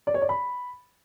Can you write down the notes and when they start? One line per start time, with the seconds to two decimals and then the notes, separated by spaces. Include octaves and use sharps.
0.07 D5
0.14 C#5
0.22 D5
0.29 B5